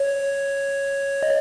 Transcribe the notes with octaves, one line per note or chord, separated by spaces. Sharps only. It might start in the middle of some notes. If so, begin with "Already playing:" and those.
Already playing: C#5
D#5